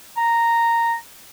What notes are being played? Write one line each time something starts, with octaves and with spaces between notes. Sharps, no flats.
A#5